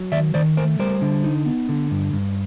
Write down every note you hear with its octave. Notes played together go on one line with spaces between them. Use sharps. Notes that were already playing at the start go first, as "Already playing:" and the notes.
Already playing: F#3
D#3 D5 E5
D#3 C5 D5
A3 A#4 C5
G3 A#4 C5
D3
D#4
B3
D3
G2
G2